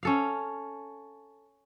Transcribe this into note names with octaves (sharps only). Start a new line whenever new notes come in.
C#4 A4 F5